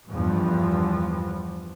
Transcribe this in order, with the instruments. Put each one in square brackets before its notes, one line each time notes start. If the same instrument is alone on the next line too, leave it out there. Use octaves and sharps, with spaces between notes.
[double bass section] E2 G2 F3